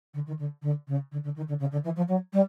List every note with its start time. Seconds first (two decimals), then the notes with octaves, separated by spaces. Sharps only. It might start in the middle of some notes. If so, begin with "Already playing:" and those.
0.14 D3
0.26 D#3
0.39 D3
0.62 D3
0.87 C#3
1.11 D3
1.23 D3
1.36 D#3
1.48 D3
1.59 C#3
1.71 D3
1.84 E3
1.96 F3
2.08 F#3
2.33 G3